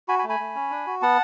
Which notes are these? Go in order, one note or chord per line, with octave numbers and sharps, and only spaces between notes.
F#4 G#5 B5
G#5 B5
A3
G#5 B5
A3
C#4
D4
F#4
B3 F#5 A5